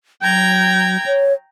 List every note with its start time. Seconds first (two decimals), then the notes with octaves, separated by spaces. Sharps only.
0.22 F#3 G5 A#5 G#6
1.06 C#5